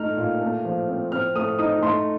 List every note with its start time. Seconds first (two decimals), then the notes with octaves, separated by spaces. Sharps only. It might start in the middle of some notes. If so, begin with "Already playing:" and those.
Already playing: A3 D#4 F6
0.17 A#2
0.41 A3
0.65 F3
0.88 C4
1.12 C4 F6
1.35 A3 D#6
1.59 D#4 D#6
1.83 A3 C6